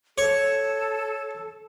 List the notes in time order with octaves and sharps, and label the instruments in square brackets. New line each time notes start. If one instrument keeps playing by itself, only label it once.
[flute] A4 [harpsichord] C#5